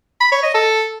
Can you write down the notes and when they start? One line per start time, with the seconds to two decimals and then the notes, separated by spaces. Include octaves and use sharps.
0.20 B5
0.32 C#5
0.43 D#5
0.54 A4